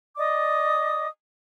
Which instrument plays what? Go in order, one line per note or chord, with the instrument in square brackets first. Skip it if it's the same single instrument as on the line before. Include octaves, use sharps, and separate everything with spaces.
[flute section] D5 D#5 D6 D#6